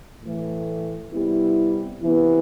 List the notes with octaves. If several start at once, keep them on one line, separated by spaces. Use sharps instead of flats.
A2 E3 A3
C3 G3 B3 E4
C3 E3 B3 E4